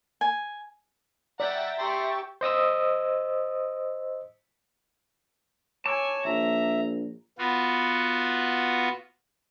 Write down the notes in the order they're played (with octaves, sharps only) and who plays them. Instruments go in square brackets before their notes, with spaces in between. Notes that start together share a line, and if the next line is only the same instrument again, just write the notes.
[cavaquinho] G#5
[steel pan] D5 [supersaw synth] E5 G5 A6 [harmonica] F#5 A#5
[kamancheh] G4 C#6 [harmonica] A#5 C6
[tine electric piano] C5 D#5 D#6 E6
[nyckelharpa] C#5 G#5 [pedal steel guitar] A5 D6 E6
[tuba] A#1 [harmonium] E5 [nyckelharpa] A#5
[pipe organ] B3 F4 F#4